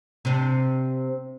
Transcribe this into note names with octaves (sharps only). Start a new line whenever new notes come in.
C3 D4